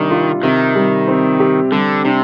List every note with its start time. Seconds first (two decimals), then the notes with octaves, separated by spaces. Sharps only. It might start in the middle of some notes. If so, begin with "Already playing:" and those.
Already playing: C3 D#3 G3 D4
0.11 F4
0.43 C3 D#3
0.76 G3
1.08 C4
1.40 G4
1.72 D3 G3
2.05 C3 D4